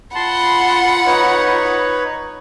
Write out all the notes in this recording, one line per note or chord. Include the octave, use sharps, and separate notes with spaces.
F4 F#5 A5 B5 C6
D#4 B4 C#5